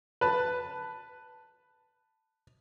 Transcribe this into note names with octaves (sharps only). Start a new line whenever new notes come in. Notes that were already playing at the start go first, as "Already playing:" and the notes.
B4 A5